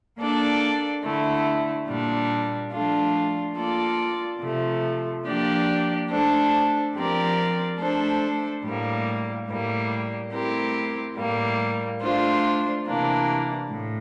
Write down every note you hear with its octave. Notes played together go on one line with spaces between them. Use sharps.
A#3 D4 A4 D5
D3 A3 E4
A#2 G3 D4
F3 A3 D4 F4
A#3 F4 A4 D5
C3 F3 A3
F3 A#3 D4 G4 D5
A3 D4 A4 C5
F3 C4 G4 A#4 D5
A3 D4 A4 C5
A2 G3 A#3
A2 G3 A#3
A3 C4 E4 G4 A#4
A2 G3 A#3
A3 D4 F4 C5
C3 E3 A#3 D4
A2